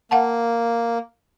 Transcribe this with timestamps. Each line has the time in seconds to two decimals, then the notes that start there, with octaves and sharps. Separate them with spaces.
0.11 A#3 F5 F#5 A5